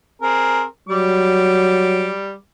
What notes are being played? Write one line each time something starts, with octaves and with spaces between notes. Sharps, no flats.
C4 G#4 A#4
F#3 G3 D6